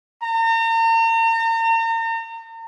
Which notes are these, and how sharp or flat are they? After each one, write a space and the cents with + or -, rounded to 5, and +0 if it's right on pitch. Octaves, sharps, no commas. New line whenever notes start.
A#5 -40